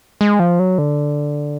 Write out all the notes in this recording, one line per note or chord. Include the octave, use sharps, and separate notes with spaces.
G#3
F3
F#3
D3